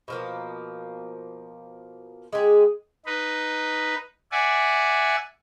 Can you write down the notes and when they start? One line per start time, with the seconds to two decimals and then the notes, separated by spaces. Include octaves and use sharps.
0.08 B2 F3 A#3
2.33 G#3 G4 G#4
3.06 D#4 B4
4.31 D5 E5 F#5 G#5